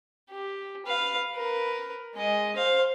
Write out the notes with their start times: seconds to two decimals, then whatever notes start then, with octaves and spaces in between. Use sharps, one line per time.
0.30 G4
0.86 B4 F5
1.35 A#4 B4
2.15 G#3 D#5
2.56 C5 F5